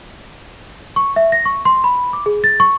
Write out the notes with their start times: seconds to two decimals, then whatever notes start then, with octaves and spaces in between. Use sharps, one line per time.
0.96 C#6
1.16 E5
1.32 A#6
1.45 C#6
1.65 C6
1.84 B5
2.13 D6
2.26 G#4
2.44 A6
2.60 C#6